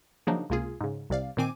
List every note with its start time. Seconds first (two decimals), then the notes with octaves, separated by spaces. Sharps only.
0.27 C#3 F3 F#3 A#3 D4 D#4
0.50 C#2 C3 A#3 F4 G#4
0.81 G#2 C#3
1.10 C2 C3 D5 F5
1.37 A#2 D#3 C4 G#5 D6 D#7